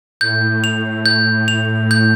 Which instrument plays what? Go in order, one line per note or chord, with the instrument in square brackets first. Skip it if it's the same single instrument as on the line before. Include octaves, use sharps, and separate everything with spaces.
[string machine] A2 [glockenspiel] G6
[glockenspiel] F7
G6
F7
G6